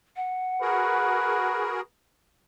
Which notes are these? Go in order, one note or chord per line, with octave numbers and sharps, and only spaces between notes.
F#5
F#4 G#4 A#4 B4